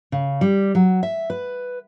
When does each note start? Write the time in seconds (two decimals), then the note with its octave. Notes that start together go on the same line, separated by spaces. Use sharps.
0.12 C#3
0.41 G3
0.75 F#3
1.03 E5
1.30 B4